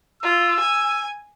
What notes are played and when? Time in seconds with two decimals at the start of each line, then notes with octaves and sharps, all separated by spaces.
0.23 F4 E6
0.60 G#5